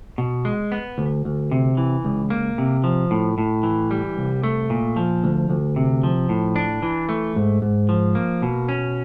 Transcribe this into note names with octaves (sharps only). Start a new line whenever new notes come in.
B2
G#3
B3
D2
D2
C3
E3
C#2
A#3
C3
F3
A2
A2
E3
G3
C2
A3
A#2
F3
D2
D2
C3
F3
A2
D4
E3
A3
G#2
G#2
F3
A#3
B2
C#4